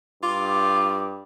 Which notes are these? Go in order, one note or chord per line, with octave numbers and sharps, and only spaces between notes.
G2 F4 D6